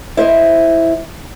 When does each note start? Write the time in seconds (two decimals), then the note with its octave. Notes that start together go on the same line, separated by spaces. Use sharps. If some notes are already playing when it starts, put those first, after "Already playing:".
0.17 E4 C5 D#5